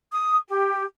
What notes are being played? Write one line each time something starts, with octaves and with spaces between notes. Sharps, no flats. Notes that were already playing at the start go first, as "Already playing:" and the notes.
D#6
G4